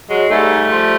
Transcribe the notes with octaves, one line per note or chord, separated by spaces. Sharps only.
F#3 G#3
G#2 G3 A3
F3